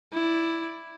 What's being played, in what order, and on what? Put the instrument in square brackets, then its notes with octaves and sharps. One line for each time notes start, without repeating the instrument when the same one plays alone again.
[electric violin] E4 D5